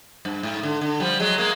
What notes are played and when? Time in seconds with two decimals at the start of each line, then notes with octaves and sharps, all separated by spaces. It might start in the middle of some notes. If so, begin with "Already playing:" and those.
0.25 G2
0.43 G#2
0.63 D3
0.81 D3
1.00 F3 G3
1.20 F#3 G#3
1.38 G#3 A#3